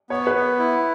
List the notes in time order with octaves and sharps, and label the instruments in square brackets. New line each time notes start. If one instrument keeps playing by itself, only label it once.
[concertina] B3 [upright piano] C#5
[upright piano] B4
[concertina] B3
E4